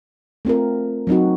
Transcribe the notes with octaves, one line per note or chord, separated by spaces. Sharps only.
A3 C4 F4 A#4
F#3 C4 D#4 F#4